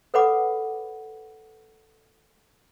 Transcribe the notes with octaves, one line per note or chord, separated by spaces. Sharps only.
A4 B4 C#5 F#5 B5 D6